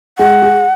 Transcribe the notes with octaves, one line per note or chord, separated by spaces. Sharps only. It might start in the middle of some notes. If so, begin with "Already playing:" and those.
G#3 F#5
G#4